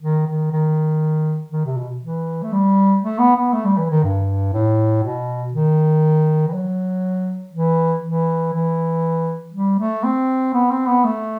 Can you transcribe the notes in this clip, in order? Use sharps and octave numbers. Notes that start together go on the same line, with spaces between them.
D#3
D#3
D#3
D#3
C3
B2
E3
A3
G3
A3
B3
B3
A3
G3
E3
D#3
G2
A2
B2
D#3
E3
F#3
E3
E3
E3
G3
A3
C4
B3
C4
B3
A3